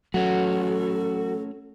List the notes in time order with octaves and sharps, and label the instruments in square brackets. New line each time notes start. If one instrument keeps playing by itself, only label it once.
[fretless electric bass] F#3 [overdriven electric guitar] A3 C#4 [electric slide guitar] F#4 [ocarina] A4